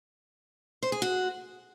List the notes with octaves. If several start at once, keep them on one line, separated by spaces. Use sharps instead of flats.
C5
G#4
F#4